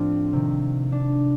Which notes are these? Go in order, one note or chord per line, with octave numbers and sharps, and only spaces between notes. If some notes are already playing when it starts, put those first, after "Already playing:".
Already playing: A2 F3 C4 D4 F4
C3 D#3
D4